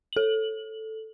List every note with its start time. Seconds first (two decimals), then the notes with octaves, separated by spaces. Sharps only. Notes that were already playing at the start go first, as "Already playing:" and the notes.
0.13 A4 F#7